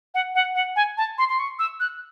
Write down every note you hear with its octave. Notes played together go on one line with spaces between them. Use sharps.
F#5
F#5
F#5
G#5
A5
C6
C6
C#6
E6
F#6